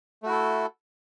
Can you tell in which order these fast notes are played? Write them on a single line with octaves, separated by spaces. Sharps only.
A3 F#4 E4 A4